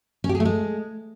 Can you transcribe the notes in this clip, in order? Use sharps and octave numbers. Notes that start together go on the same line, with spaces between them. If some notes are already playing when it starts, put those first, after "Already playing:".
C#4
G4
G#4
A3
G#3